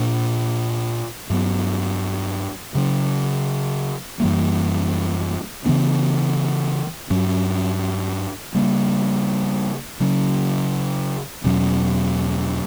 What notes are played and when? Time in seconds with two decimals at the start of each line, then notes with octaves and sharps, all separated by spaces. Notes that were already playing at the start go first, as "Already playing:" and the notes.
Already playing: A#2 A#3 D4
1.30 G2 F#3 B3
2.75 C#3 F#3 C#4
4.20 F#2 E3 G3 A#3
5.65 C#3 E3 B3 D4
7.10 G2 F#3 C#4
8.55 C#3 G3 A#3
10.00 C#3 F#3 C#4
11.44 E2 B2 F#3 C#4